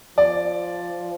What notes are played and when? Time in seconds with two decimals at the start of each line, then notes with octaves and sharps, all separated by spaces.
0.17 F3 D5